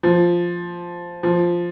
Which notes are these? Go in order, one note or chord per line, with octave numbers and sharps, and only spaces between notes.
F3
F3